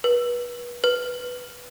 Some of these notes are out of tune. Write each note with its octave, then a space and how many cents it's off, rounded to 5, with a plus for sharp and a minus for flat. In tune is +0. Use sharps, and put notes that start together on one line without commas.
B4 -30
B4 +0